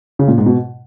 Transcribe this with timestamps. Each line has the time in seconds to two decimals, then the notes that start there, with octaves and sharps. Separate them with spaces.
0.19 C#3
0.28 A#2
0.38 G#2
0.46 B2